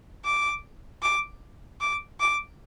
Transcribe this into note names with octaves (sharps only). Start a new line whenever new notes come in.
D6
D6
D6
D6